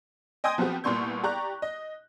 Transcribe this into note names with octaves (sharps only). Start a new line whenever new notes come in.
D#5 G5 G#5 C6 D#6
F3 B3 C4 F#4 G4
C2 A#2 B3 C6 C#6 G6
G4 D5 A#5 C#6 F#6
D#5